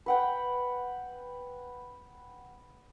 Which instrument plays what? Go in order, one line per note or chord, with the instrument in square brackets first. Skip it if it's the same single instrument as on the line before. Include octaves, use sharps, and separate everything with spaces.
[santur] B4 F#5 G5